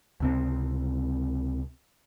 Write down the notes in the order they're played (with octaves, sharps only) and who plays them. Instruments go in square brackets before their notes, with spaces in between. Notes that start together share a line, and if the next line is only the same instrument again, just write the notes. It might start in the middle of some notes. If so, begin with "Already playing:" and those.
[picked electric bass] C#2 C3 C4